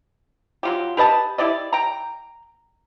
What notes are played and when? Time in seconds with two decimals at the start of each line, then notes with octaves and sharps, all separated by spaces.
0.63 F#3 F4 G4
0.97 G4 B4 D#5 A5
1.38 E4 G4 D5 D#5
1.73 G5 A#5